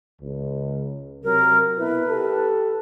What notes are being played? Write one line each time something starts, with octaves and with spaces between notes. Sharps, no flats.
C#2
C3 F#3 A#4
B2 E4 B4
G4 A4